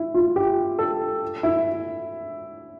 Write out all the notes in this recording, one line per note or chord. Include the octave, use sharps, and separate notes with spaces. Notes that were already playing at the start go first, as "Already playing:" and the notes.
Already playing: E4
F4
G4
A4
E4